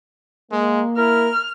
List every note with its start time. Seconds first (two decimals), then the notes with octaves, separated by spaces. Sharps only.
0.51 G#3 A#3
0.97 E4 A#4 F6